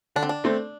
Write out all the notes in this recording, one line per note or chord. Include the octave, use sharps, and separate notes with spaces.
D3 D4
C4
D4
A3 C4